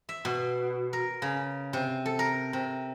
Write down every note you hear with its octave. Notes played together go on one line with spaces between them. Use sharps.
E5
B2
A#4
C#3
C3
A4
A#4
C3